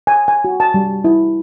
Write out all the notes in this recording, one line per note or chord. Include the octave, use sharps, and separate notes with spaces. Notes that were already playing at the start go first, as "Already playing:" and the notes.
G#5
G#5
F#4
A5
G3
E4